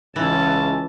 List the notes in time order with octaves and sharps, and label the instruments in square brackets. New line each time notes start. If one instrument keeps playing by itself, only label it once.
[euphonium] C#2 [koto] E3 [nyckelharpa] C#4 A5